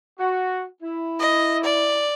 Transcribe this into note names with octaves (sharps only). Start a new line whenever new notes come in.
F#4
E4
D#5
D5